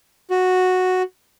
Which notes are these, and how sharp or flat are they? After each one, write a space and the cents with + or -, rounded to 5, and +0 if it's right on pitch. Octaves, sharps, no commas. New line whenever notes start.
F#4 -5